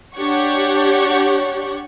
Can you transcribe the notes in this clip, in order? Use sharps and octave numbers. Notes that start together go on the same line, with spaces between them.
D4 G4 C#5 F#5 C#6